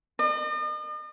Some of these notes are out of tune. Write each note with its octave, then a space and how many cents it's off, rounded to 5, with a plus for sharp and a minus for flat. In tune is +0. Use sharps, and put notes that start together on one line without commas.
D#5 -45